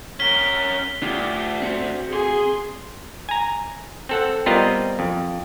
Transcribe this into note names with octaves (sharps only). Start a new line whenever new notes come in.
C#4 A#4 B6 G7
D2 D4 F4 G4
C4 F#4 C5
G#4 C6
G#5 A#5
C4 A4 F#5
G3 B3 C4 F4 A#4 D#5
F2